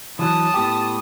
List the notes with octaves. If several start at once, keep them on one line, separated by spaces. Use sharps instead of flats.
E3 F#3 A5 D#6
A2 B3 G4